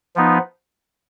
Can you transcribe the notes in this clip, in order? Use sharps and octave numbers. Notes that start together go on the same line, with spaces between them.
F3 B3 D#4